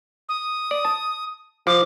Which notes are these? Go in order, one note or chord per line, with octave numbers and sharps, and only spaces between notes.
D#6
D5
A5
F3 D6